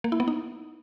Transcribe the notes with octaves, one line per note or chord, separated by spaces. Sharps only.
A#3
E4
B3
D#4